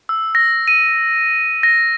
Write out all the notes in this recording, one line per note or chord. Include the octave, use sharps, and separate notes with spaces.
E6
A#6
D#7
A#6